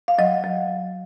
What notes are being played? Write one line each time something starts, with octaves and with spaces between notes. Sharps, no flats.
F5
F#3 D#5
F#3